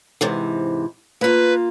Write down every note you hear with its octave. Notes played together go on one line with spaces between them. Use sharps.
G#2 C3 E3
A#3 F4 B4